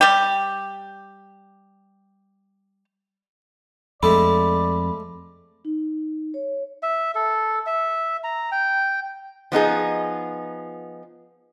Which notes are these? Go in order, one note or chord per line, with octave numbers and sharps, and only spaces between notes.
G3 G4
F2 G#3 A3 A4 D5 B5
D#4
C#5
E5
A4
E5
A#5
G5
F3 B3 D#4 G#4